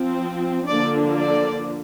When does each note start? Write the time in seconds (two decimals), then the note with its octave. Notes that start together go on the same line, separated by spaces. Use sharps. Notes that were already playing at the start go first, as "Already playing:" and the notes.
Already playing: F3 C4
0.68 D3 F3 A#3 D4 D5
1.18 D5